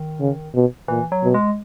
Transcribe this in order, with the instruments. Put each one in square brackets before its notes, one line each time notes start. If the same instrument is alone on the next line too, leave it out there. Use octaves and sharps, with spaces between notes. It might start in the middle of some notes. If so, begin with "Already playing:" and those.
Already playing: [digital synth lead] D#3
[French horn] C#3
B2
[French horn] A#2 [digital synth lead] E3
[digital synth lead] F#3
[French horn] B2
[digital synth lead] G#3